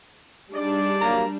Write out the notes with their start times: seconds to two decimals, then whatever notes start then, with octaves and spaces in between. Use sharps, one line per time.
0.52 G3 D4 D#4 G#4 D5
1.01 F#3 A#3 A#5